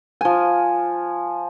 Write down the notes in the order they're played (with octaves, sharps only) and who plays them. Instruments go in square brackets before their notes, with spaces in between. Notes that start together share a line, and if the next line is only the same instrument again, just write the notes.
[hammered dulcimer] F3 G#5